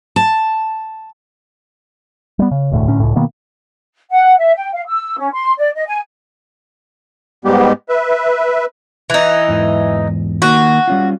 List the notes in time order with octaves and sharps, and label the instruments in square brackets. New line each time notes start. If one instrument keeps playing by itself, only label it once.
[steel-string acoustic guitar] A5
[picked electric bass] G3 B3
C#3
E1 D2 A2
D2 A2 C#4
C#2 A2
B2 D#3 A#3 B3
[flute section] F#5
E5
G5
F5
E6
C#4
C6
D5
D#5
G#5
[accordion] G#2 G3 G#3 B3 G4
B4 E5
[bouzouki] E3 D#4
[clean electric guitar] E2 G#2 D#5
[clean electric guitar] D#3 A#3 [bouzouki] F#4
[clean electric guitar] G3 C#4 F4